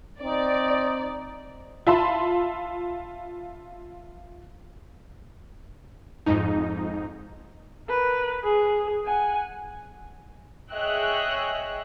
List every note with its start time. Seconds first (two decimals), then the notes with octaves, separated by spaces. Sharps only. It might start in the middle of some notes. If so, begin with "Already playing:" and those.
0.22 C4 D#4 D5
1.87 F4 E5 A5 B5 C6
6.26 F2 G#2 D#4
7.89 A#4 B4
8.44 G#4
9.06 F#5 G#5
10.72 G#4 C#5 D#5 E5 G5 F#6